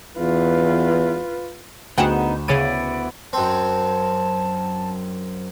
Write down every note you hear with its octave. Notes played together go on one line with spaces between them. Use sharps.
E2 F4 B4
D2 B3 D#4 G#4 F#5 G5 E7
C#3 B3 C#4 E4 D5 D#7
F#2 C4 A5